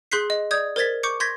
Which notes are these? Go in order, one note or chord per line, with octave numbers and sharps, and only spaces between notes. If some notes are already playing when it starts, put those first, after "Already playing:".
G#4 C6 F#6 G6 B6 C7
D#5
D5 D#6 G6 G#6
A#4 C5 G#6 A6 B6
C#6 D6 G6 C#7
C6 G6 G#6 A#6 B6